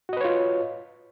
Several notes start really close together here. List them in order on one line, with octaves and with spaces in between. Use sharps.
F#4 D#5 B4 C#5 F4